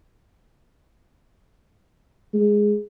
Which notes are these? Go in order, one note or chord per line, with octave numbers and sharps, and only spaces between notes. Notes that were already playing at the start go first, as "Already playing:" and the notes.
G#3